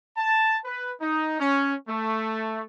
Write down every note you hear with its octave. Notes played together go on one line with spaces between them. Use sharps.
A5
B4
D#4
C#4
A3